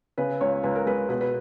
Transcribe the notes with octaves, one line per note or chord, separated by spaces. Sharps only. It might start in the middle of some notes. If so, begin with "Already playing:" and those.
C#3 B4
C#2 C#5
C#2 B4
A#4
G#3 B4
B2 B4
B4